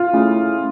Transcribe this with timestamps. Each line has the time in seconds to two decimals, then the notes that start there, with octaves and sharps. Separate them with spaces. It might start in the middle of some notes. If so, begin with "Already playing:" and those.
Already playing: F4
0.13 A3 C#4 E4 G#4